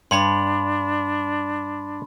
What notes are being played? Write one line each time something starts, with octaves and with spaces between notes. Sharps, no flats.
G2 D4 C#5 B5 C6